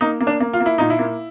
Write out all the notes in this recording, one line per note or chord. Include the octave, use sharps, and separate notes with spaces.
A#3 D#4
A#3
D4
A#3
F4
A#3
E4
A#2 D#4
E4
A#3